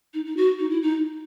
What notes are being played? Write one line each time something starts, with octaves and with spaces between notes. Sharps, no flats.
D#4
D#4
F#4
D#4
E4
D#4